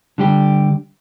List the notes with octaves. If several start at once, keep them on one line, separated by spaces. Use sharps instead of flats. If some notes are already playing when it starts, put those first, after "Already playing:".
D3 G3 G4